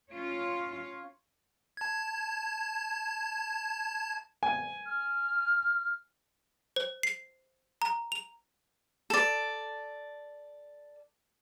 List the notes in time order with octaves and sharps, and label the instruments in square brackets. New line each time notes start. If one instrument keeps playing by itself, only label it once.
[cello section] C#4 F4 C#5
[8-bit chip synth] A5 G#6
[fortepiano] G#5
[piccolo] F6
[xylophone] C5
C7
A#5
F7
[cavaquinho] A4 D5